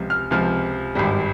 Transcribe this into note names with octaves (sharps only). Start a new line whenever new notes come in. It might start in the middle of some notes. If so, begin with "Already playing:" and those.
Already playing: C#2 C3 F3
F6
C#2 C3 F3 F6
G#1 G2 G3